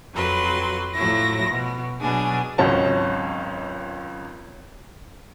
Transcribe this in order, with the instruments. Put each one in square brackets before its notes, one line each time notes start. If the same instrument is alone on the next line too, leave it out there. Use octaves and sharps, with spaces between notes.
[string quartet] F2 F#3 B4 C6
A2 F3 F#3 E4 A#6
B2
B2 F#3 D4 G#4 G#5
[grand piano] G#1 C#2 F#3 C#4 A5